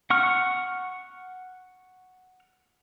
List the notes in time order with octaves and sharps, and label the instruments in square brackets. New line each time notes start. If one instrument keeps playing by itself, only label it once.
[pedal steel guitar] F#5 C#6 F6